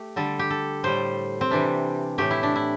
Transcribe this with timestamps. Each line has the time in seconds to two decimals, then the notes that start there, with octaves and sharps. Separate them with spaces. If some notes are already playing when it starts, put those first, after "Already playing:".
Already playing: A3 G4
0.16 D3 G3 A4
0.39 G4
0.50 A4
0.83 A2 G3 C5
1.41 C4
1.51 C3 E3 G3 D4
2.18 A2 E3 A3 G4
2.31 E4
2.43 D4
2.56 E4